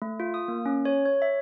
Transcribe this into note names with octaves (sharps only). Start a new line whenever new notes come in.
A3
F4
D#6
A#3
C#4
C#5
C#5
E5